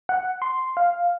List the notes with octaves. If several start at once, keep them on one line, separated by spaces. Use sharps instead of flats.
F#5
C6
F5